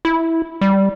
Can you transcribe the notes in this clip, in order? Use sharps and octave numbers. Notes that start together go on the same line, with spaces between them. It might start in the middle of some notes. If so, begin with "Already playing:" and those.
E4
G3